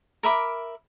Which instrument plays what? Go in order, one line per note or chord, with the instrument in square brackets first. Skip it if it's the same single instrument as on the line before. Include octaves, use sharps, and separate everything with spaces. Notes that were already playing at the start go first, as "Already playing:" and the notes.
[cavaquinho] A#4 E5 B5 D6